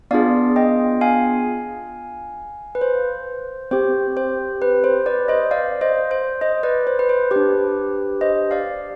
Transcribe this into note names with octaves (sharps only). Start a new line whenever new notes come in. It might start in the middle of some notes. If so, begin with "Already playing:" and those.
B3 D4 F4 G#4 D5 F5
D#5 G5
F5 G#5
B4
C5
C4 G4 C5
C5
B4
C5
B4 D5
C5 D#5
D5 F5
C5 D#5
C5
C5 D#5
B4 D5
C5
B4
C5
D4 G4 B4
C5 D#5
D5 F5